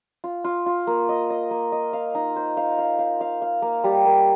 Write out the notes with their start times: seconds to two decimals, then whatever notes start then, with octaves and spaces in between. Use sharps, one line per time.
0.24 F4
0.44 F4
0.66 F4
0.87 A#3
1.09 D#5
1.30 D#5
1.51 A#3
1.72 D#5
1.93 F5
2.15 D#4
2.36 C5
2.57 F5
2.79 F5
2.99 F5
3.21 F5
3.42 F5
3.62 A#3
3.84 G3
4.06 A#3